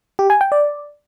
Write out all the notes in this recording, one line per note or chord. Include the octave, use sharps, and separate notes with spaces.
G4
G#5
G5
D5